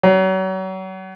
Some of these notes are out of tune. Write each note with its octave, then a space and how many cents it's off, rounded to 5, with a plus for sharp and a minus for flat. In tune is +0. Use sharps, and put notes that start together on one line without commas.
F#3 +35